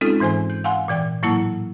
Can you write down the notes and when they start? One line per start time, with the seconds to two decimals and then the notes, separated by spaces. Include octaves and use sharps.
0.01 G#3 C4 C#4 D#4 F4 A4
0.20 G#2 E3 C5 G#5 C6
0.50 G6
0.64 F5 F#5 G#5 C6
0.88 A#2 E3 D5 G5
1.23 A2 F#3 A#3 E4 A5